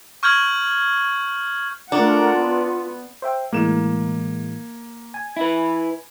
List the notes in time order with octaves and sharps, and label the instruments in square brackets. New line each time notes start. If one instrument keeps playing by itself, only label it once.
[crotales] C#6 F6 G6 G#6 F#7
[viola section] A3 A#4 F#5 [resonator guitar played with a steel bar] D4 [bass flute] F4
[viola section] B3
[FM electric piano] C5 E5 G5
[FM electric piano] A2 E3 G#3 [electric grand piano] A#3 E7
[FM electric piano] G#5
[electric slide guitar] E4 B4